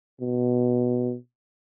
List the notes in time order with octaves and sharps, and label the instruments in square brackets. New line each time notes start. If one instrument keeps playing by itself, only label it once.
[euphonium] B2